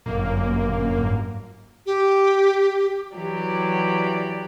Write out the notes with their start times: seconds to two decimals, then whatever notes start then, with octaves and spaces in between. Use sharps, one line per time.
0.06 G1 F#2 A#2 A#3
0.97 G#2
1.86 G4
3.16 E3 F#3 G4 D5